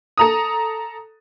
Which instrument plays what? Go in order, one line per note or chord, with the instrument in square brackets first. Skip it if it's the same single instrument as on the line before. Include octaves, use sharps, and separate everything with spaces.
[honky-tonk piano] A4 A#5 D#6